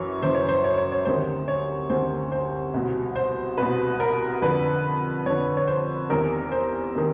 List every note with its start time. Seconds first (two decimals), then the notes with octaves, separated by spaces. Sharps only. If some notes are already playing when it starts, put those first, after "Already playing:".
Already playing: F#2 E3 C#5
0.22 F#2 C#3 E3 C5
0.35 C#5
0.49 C5
0.64 C#5
0.78 C#5
0.92 C#5
1.05 D2 C3 D#3 C5
1.48 C#5
1.89 D2 C3 D#3 C5
2.32 C5
2.74 C2 B2
3.16 C5
3.57 C2 B2 B4
4.00 A#4
4.42 F2 D3 B4
5.26 F2 D3 C#5
5.57 C#5
5.67 C5
6.10 E2 C3 D#3 A#4
6.52 C5
6.95 C3 D#3